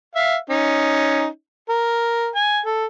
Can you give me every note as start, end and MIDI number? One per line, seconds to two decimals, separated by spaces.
0.15 0.36 76
0.15 0.36 77
0.50 1.26 61
0.50 1.26 63
1.69 2.28 70
2.35 2.60 80
2.65 2.85 69